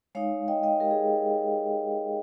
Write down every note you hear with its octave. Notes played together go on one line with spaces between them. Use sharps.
G#3 D#4 C#5 F5
D#5 G5
D#5 G5
G4 A#4
G#4